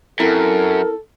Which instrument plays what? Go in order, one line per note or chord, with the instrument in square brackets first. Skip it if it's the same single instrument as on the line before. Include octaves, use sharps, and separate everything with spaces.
[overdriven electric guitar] F#2 [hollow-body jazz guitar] C4 E4 A#5 [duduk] A4 [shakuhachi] A#4